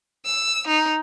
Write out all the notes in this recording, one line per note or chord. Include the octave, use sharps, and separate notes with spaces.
E6
D#4